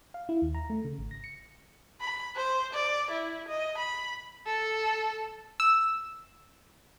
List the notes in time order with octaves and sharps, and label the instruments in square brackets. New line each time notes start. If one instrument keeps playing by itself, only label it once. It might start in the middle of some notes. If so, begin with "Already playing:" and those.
[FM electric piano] F5
E4
D#2
A#5
A3
C#3
G#1
A#6
C#7
[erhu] B5
C5
D5
E4
D#5
B5
A4
[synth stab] E6